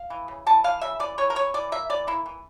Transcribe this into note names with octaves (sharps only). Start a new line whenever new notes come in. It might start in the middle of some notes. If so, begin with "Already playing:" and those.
Already playing: F5
E3
C#3
E3 A5
E3 F5
C#3 E5
E3 D5
E3 C#5
A#4
E3 C#5
E3 D5
A#3 E5
E3 D5
A#3 E4
E3